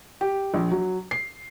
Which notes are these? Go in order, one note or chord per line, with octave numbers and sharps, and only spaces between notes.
G4
A#1
F#3
C7